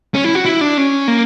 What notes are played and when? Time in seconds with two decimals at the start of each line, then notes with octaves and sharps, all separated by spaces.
0.14 C#4
0.24 E4
0.35 F#4
0.45 E4
0.61 D4
0.78 C#4
1.08 A#3